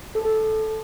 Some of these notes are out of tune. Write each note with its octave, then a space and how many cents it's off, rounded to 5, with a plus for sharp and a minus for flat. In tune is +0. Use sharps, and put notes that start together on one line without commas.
A4 -10